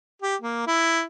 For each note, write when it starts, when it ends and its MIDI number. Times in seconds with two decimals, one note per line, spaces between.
0.22 0.36 67
0.42 0.64 58
0.67 1.03 64